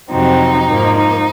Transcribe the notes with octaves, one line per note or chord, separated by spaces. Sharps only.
F2 C3 F#3 C4 D#4
G#2 F3 A#3
D#4